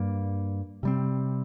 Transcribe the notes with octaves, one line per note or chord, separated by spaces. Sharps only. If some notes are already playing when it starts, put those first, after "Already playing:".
Already playing: G2 G3 A#3
C3 G3 C4